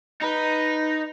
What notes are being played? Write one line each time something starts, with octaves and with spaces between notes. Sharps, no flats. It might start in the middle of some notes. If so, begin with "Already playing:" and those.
D#4 B4